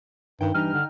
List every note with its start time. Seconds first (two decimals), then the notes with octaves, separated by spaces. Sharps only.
0.41 G2 D#3 G5
0.54 G2 E3 D#4 F6
0.74 D3